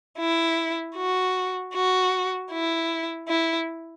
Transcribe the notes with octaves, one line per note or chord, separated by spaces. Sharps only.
E4
F#4
F#4
E4
E4